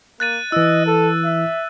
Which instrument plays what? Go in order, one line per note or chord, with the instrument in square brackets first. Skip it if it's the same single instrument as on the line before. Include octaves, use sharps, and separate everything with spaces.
[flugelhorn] A#3 [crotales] F#6 A6 D#7
[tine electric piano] E3 E4 [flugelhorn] D#5 [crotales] E6
[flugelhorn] A4
E5